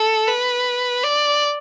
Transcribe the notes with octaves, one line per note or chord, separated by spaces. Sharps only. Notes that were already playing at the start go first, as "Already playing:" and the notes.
Already playing: A4
B4
D5